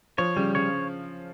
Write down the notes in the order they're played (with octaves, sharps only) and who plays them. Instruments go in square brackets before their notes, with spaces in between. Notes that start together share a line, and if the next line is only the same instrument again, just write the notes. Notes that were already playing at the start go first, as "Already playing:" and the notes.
[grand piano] F3 [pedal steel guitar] C#5
[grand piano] C#3 [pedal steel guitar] G3
[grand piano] C#3 [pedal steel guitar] C#5